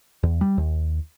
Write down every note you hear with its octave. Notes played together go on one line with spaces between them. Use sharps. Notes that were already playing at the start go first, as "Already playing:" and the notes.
E2
G3
D#2